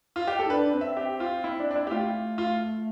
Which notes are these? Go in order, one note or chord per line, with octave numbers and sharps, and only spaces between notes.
F4
G4
A4
E4
D4 B4
C4
E5
G4
F4
E4
D4
D4
E4
G4
A3 F4
F4